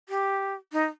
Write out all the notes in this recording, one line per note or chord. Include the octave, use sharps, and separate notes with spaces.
G4
D#4